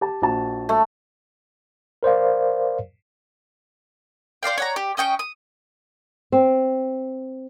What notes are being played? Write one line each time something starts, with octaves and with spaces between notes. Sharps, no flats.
G4 A5
A#1 F#4 A5
A3
A#4 C5 D5 F5
C5 D5 F5 G5
C#5 F#5 A#5
G4
C#4 D#5 G5 C#6
D#6
C4